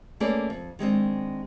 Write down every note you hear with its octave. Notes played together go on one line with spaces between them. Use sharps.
A3 A#3 C#4 G#4 B4 D5
F2
D#3 G#3 C4 D4